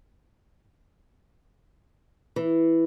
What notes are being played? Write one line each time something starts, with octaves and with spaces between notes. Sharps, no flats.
E3